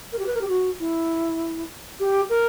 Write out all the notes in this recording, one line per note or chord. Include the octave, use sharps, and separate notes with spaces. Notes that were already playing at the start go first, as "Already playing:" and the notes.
A#4
G4
B4
A#4
G4
F#4
E4
G4
A#4